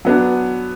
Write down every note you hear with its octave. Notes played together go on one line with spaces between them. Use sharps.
F#3 B3 D4